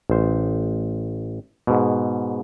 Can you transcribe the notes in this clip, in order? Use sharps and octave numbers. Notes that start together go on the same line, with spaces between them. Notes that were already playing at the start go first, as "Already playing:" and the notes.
A1 C5
G#2 B2